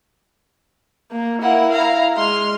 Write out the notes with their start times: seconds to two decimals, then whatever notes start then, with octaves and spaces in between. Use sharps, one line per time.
1.11 A#3
1.42 A#3 E4 F#5
1.72 F5 A#5
2.17 G#3 C6 F6